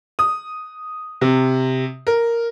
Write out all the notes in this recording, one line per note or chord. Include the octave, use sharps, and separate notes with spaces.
D#6
C3
A#4